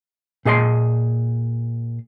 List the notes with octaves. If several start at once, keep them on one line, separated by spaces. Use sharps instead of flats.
A#2 G#4 D#5 A5 C6